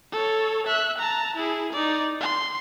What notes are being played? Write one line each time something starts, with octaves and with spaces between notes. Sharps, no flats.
A4 C#5
E5 F#6
A5 A#5
E4 G#4
D#4 D5
C6